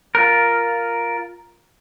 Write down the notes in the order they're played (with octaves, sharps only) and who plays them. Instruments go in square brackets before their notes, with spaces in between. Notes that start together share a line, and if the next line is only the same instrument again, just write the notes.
[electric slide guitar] F4 A#4